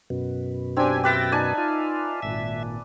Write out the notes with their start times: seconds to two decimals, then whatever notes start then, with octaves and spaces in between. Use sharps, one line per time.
0.10 F#2 B2
0.76 C4 D4 G4 G#5 E6
1.03 G4 B4 E5 G5 A6 A#6
1.32 D#4 D5 G#5 A5
1.58 F4
2.22 G#1 A#2 E5